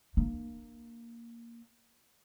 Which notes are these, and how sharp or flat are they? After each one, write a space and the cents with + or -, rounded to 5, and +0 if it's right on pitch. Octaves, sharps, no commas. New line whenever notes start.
A#3 +0 D4 +30